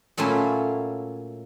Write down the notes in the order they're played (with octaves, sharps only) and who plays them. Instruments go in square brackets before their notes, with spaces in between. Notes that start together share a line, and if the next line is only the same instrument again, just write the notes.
[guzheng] A#2 F#3 A3 C#4 E4 F4